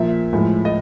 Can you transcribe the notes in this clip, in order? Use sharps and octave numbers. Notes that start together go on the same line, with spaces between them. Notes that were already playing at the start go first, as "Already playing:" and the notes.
Already playing: A#2 F3 A#3 E5
A2 F3 G#3
D#5